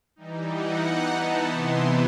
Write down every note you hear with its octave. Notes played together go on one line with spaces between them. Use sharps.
E3 G3 D#4
F#5
E3 B3 D#4
A5
C3 E3 B3 E4 C6